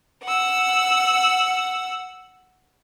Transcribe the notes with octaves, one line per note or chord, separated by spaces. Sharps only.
F#5 E6